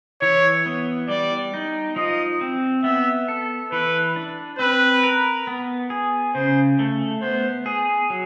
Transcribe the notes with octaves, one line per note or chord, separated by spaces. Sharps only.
E3 C#5
B3
G3 D5
D#4
F3 D#5
C4
B3 E5
A4
E3 B4
D4
C4 B4
A#4
B3
G#4
C#3 C5
A3
B3 C5
G#4
F#3